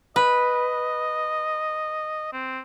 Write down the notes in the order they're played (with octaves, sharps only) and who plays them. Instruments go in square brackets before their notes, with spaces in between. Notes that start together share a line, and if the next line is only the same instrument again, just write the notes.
[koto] B4 [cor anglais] D#5
[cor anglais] C4